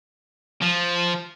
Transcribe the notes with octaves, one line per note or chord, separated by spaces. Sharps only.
F3